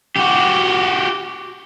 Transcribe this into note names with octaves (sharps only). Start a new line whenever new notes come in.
F#4 G4